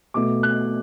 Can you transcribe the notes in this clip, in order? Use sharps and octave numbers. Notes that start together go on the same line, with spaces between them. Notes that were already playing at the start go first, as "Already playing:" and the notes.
B2 A3 D6
F#6